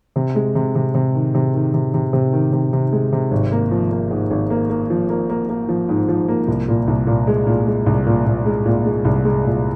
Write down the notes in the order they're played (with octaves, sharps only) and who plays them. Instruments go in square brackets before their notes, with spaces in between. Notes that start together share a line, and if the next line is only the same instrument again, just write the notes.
[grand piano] C3
G#3
C3
C3
C3
D#3
C3
D#3
C3
C3
C3
D#3
C3
C3
G#3
C3
G#1
A#3
F3
A#3
G#2
G#1
A#3
A#3
F3
A#3
A#3
A#3
F3
G#2
F3
A#3
C2
A#2
C2
A#2
G#3
A#2
G#3
C2
A#2
A#2
G#3
A#2
G#3
C2
G#3
A#2